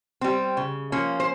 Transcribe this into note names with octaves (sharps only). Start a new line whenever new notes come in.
G3 C4
C#3
F3 A#3 C#4
C5